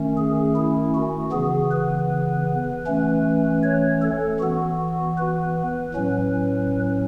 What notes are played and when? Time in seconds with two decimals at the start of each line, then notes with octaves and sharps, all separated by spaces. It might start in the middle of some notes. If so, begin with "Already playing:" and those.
Already playing: D#3 A3 C#4
0.17 G#4
0.55 E4
0.94 F#4
1.32 C#3 E3 B3 G#4
1.71 B4
2.86 E3 A3 C#4
3.63 C#5
4.02 A4
4.40 E3 B3 F#4
5.17 B4
5.94 A2 F#3 C#4